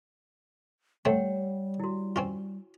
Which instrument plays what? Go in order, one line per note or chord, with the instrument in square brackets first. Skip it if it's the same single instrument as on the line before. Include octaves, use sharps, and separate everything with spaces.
[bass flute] G3 [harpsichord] A3 C4 [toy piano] C#5 F#5 G5
[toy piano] E4 F#4
[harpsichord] C4 C#4 F4